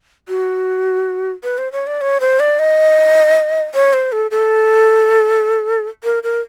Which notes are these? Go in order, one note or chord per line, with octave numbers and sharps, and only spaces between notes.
F#4
B4
C5
C#5
D5
C#5
C5
D5
D#5
C#5
C5
A4
A4
A#4
A#4